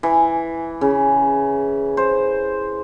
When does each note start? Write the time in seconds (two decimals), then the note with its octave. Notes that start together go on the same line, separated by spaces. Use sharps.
0.03 E3
0.81 C#3
1.97 C5